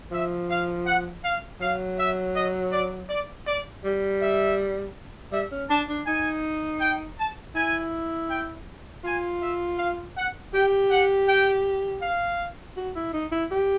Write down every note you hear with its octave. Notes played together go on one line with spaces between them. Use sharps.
F3 E5
F5
F#5
F5
F#3 F5
E5
D#5
D5
D5
D5
G3
E5
G3 E5
C#4
D4 A5
D4
D#4 G#5
G5
A5
E4 G#5
G5
F4 G#5
E5
F5
F#5
G4 G5
F#5
G5
F5
F#4
E4
D#4
E4
G4